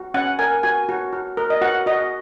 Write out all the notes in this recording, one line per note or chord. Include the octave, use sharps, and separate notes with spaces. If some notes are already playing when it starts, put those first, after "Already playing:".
Already playing: F#4
C#4 F#5
A#4 G#5
F#4 G#5
F#4
F#4
A#4
D#5
F#4 F#5
F#4 D#5